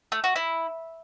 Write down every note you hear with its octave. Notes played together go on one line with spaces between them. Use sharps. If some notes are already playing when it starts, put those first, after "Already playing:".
A3
F#4
E4